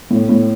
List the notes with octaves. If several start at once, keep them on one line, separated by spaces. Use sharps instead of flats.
A2
A2